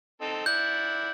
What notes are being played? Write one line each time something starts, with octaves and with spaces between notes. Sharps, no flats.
C4 D#4 A4
E4 D5 F#5 G6